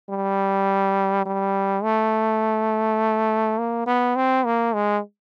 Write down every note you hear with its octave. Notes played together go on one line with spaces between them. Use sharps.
G3
G3
A3
A#3
B3
C4
A#3
G#3